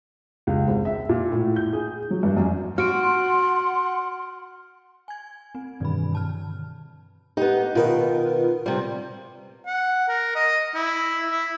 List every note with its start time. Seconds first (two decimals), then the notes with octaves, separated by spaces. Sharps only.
0.47 C#2
0.68 G#1
0.85 E5
1.09 A#2
1.32 A2
1.56 G6
1.73 G#4
2.11 F#3
2.23 G2
2.37 F#2
2.78 F#4 F#5 C6 F6 D7
5.08 G#5 G#6
5.55 C4
5.80 G2 B2 D#3 E3 B5
6.13 D3 A5 F6
7.37 B3 D#4 G4
7.75 B2 D#3 F4 A#4 B4
8.66 C3 G3
9.66 F#5
10.09 A#4
10.35 D#5
10.74 E4
11.31 E4